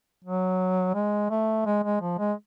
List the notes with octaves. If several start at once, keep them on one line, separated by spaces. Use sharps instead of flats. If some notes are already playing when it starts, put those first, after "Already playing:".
F#3
G#3
A3
G#3
G#3
F3
G#3